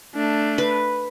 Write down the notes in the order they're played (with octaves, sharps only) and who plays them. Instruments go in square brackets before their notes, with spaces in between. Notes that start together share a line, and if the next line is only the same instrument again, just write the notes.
[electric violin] A3 D4
[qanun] B4